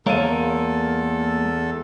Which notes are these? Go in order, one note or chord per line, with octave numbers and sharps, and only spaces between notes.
E2 G#3 A#3 A4 A#4 C#5 F5 D#7